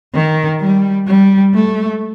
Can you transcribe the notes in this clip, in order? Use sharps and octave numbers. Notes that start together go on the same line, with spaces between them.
D#3
G3
G3
A3